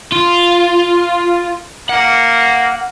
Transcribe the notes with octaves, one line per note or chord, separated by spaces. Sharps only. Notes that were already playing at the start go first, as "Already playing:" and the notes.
F4
A#3 F#5